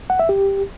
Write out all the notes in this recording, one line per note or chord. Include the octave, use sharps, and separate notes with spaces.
F#5
E5
G4